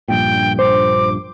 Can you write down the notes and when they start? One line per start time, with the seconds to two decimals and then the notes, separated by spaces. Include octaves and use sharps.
0.08 A#1 G2 A#2 G5
0.59 C5 D6